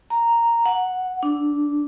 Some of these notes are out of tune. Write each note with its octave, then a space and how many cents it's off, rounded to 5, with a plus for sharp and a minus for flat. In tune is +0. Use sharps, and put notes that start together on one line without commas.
A#5 -5
F#5 -5
D4 -10